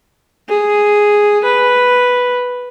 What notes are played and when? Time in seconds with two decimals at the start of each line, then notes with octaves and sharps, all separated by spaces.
0.49 G#4
1.44 B4